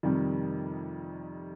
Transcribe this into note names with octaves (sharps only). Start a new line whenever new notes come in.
F2 C3 D#3 G3